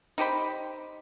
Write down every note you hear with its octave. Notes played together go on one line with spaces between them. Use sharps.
D#4 G4 C5 B5